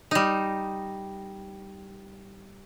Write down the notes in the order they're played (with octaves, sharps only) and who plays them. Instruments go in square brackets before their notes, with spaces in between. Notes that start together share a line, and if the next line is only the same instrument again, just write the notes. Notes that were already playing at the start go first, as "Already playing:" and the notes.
[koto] G3 D#4